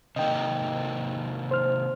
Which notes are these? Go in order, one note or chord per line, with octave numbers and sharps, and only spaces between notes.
C3 D#3 A#3 D#5 G5
C5 F6